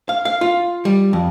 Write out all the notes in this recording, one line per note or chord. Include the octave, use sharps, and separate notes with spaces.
F5
F5
F4
G3
F2